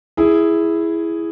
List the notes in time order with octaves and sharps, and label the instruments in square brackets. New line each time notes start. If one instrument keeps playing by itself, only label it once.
[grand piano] E4 G#4